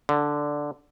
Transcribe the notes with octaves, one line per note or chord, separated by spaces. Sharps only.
D3